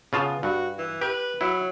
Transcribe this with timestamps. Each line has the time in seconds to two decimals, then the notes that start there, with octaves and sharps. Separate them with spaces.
0.13 C#3 B3 F4 A5
0.43 G2 F#4
0.78 E3
1.01 G4 B4
1.41 F#3 E4